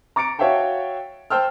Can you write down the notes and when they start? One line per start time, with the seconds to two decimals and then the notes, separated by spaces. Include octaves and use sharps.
0.16 A#5 D6 A6 C#7 D7
0.39 F#4 C#5 E5 F5 G5 A5
1.30 C5 G5 A5 E6 F6